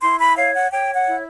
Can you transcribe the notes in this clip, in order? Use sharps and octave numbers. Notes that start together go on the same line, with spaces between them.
E4 C6
B5
C#5 F5
F#5
C#5 G5
F#5
E4